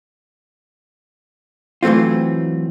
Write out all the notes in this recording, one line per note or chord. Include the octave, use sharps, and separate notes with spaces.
E3 F#3 A3 C4 F4